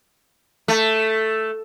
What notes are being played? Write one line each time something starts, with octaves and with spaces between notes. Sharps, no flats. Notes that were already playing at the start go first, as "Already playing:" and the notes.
A3